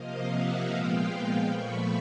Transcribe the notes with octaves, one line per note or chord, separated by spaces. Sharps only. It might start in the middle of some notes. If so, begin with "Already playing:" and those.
Already playing: C3 F3 A#3 D#5 F5
E5 F#5
A#2 F3 G#3 B3 F5 G5
A#2 F3 A3 B5 C#6